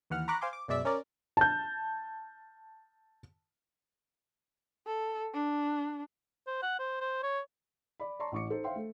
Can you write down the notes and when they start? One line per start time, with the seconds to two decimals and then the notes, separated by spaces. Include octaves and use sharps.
0.10 D#2 E3 F#5 F6
0.28 A#5 B5 C#6 D6 F#6 A#6
0.41 C5 F5 G#5 C6 D6
0.53 D6
0.68 F#2 B2 G#3 D5 E5 B6
0.85 C#4 A#4 D5
1.37 A5 G6
4.87 A4
5.34 D4
6.47 C5
6.62 F#5
6.79 C5
7.00 C5
7.23 C#5
8.00 D5 B5
8.20 D5 A5 A#5 C6 C#6
8.32 A1 E3 C#6 D6 C#7
8.50 D#4 A4 C5
8.64 C5 E5 F5 G5 C6
8.76 A3